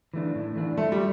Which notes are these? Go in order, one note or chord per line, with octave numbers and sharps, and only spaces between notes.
E3 A3 D4
A2
E3 A3 D4
F3 A3
G3